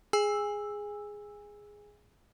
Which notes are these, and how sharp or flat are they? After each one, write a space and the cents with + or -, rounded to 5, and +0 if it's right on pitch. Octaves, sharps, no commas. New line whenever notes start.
G#4 +0 G#5 -20 E6 +0